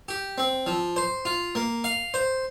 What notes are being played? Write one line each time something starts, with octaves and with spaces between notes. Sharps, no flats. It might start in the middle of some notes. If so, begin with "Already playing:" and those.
G4
C4
F3
C5
F4
A#3
F5
C5